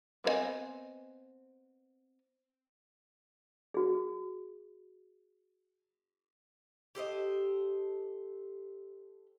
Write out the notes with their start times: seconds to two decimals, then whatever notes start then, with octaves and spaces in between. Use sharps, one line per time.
0.24 B3 C4 B4 D#5 G#5
3.74 F#4 G#4
6.95 G4 A4 C5 D#5